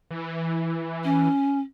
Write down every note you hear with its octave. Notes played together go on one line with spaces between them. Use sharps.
E3
C#4